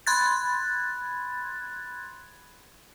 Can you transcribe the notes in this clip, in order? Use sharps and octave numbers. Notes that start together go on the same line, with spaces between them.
B5 C6 F#6 G#6 A6